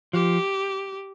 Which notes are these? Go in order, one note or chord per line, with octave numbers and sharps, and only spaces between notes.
F3 G4